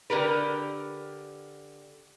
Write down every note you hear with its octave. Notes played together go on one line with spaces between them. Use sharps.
D3 G4 A#4 B4